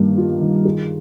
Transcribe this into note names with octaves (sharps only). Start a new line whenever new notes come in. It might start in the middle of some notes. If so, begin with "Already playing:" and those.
Already playing: G2 D#3 A#3
F4
D#3
G#4